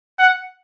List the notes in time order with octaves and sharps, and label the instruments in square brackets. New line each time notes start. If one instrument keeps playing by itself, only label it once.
[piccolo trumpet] F#5